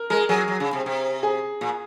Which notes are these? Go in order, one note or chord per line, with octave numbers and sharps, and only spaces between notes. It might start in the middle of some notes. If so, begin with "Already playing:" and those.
Already playing: A#4
G#3 A#4
F#3 G#4
F#3
C#3
C3
C3
G#4
A#2